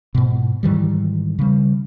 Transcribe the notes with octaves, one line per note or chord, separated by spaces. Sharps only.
G#2 B2
G#2 D#3 E3 G3
C#3 G3